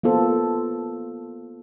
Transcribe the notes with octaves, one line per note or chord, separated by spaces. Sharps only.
A#3 B3 F4 A4 C5